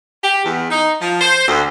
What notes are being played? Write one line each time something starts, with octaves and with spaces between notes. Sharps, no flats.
G4
E2
D#4
F3
C5
D2